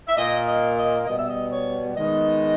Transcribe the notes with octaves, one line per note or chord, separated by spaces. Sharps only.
E5
A#2 A#3 D#5
D#5
D#5
B2 G3 B3 D#5
E5
D#5
C#5
D#3 G#3 B3 D#5